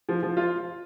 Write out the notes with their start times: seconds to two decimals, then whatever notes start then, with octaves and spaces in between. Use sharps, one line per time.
0.09 F3
0.23 F3
0.37 F4